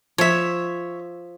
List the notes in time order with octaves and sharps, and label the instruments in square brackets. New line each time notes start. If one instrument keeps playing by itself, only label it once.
[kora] F3 [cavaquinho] C#5 E5